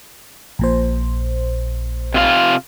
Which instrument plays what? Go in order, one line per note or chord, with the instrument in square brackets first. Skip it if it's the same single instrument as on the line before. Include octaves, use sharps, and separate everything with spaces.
[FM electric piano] A#1 A#2 C5
[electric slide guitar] C3 F4 F5